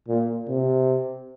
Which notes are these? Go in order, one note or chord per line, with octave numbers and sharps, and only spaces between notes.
A#2
C3